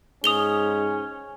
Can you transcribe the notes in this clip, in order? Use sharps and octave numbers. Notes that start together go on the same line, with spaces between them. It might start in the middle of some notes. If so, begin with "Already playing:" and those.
G#2 C#4 D#6 F7 G7